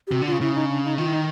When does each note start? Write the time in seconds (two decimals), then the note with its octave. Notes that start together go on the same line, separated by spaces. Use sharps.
0.07 G4
0.12 C3 F#4
0.22 D3
0.27 C#3 F4
0.41 C#3 E4
0.55 D#4
0.70 D4
0.84 D#4
0.98 D#3 F4
1.06 E4
1.13 D#4